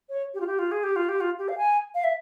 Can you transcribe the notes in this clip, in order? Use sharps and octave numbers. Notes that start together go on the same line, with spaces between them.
C#5
G4
F4
G4
F4
G#4
G4
F4
G4
F4
G4
F5
G#5
F5
E5